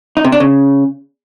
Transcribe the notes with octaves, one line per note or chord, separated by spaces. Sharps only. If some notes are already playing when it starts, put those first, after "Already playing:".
D#4
C3
D4
C#3